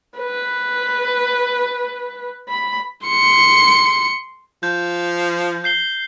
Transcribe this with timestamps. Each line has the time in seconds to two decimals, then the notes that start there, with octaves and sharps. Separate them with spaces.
0.18 B4
2.49 B5
3.07 C6 C#7
4.63 F3 G6
5.64 G6 C7 G7